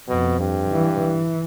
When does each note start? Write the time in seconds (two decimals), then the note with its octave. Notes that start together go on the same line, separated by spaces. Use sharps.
0.08 F2 B2
0.40 G2
0.70 E3
0.99 E3